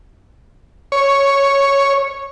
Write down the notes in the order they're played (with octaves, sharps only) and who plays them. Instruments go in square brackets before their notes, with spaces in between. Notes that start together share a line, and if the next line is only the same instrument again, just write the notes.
[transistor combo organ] C#5